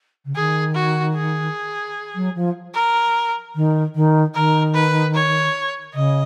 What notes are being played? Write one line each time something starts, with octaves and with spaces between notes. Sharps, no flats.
C#3
D#3 G#4
F#4
G#4
F#3
F3
A#4
D#3
D#3
D#3 A#4
B4
C#5
C#3 D#5